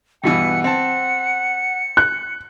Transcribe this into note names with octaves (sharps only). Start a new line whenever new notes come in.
G2 B2 E3 F#5 C#7
C4 A5 C#7
F#6